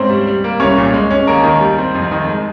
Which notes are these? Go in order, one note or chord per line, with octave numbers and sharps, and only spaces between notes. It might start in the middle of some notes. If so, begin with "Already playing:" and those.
Already playing: G#2 A#3 C4 C#4 C5
G3
G3
A#3
C2 C#4 C#5
A#2
G#3
C#4
D#2 A#3 A#4
D#3
G3
C4
F2
D#3
G#3